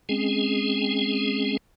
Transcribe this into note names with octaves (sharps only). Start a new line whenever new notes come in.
G#3 C4 C#4 G#4